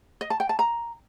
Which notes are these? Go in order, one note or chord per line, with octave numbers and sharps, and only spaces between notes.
D#5
A5
G5
A5
A#5